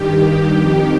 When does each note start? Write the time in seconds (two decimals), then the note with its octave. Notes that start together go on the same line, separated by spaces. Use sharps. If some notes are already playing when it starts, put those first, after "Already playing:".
Already playing: G2 D#3 G4
0.23 G4
0.57 F2 D#3